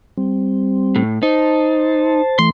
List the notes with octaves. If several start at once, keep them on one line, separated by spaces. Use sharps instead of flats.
G3 C4
A2
D#4 C5 A5
E3 A3 C6